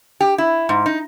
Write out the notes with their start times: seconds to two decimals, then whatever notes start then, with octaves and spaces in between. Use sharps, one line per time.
0.20 G4
0.38 E4
0.69 G#2
0.86 D#4